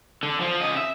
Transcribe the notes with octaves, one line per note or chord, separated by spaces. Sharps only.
D3
F3
C#3 D#5
E5